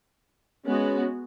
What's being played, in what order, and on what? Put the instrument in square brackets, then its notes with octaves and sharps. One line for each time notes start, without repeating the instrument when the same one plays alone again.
[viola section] G#3 B3 F#4 [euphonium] C#4